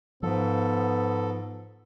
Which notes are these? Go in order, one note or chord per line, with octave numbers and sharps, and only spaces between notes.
G#2 F3 B3 A4